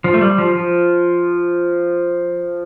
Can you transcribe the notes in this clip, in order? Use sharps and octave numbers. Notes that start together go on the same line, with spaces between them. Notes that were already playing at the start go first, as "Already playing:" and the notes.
F3
A3
G3
F3
F3